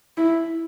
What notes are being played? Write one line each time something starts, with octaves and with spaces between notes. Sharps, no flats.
E4